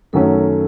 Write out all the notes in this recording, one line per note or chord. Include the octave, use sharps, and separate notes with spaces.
F#2 D#3 F#3 A3 C#4 A4